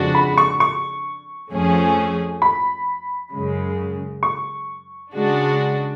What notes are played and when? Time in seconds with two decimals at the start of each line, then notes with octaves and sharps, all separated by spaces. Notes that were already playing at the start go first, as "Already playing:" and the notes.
Already playing: F2 C#3 G#3 D4 F#4
0.15 B5
0.38 C#6
0.60 C#6
1.51 F2 F3 A3 C#4 G#4
2.42 B5
3.32 F#2 C#3 G#3
4.23 C#6
5.14 C#3 G#3 D4 F#4